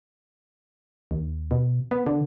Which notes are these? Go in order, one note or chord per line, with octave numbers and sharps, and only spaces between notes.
D#2
B2
B3
D3